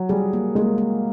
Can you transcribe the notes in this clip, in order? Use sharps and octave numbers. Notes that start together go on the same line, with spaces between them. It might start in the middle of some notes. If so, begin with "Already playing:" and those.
Already playing: F#3
G3 G#4
A#3
G#3 A#3
A#3